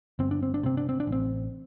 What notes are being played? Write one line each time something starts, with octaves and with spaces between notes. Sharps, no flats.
G1 C4
D4
C4
D4
C3 C4
D4
C4
D4
A1
C4